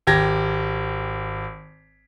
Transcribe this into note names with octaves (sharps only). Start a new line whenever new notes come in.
G#1 G4 G#6 A#6